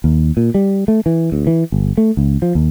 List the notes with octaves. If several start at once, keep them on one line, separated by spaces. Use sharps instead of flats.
D#2
A#2
G3
A3
E3
D2
E3
G1
A3
C#2
F3
D#2